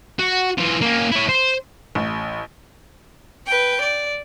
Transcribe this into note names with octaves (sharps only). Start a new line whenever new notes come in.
F#4
E3 F4
A#3 C#4
E4 C#5
C5
A1
B4 G5
D5